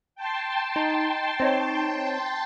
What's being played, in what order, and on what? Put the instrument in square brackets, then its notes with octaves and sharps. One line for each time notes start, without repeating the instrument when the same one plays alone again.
[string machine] G5 A5 C6
[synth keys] D#4
C4 D#4 C#5